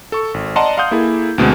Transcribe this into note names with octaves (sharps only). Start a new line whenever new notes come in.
A4 C#6
G#1
D5 D#5 F#5 A5 A#5 C6
F5 F#5 C6 D#6 G6
A#3 E4 G#4 A4
D2 B2 G#3 C4